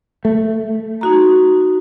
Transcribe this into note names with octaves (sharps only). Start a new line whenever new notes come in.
A3
D#4 F#4 A#5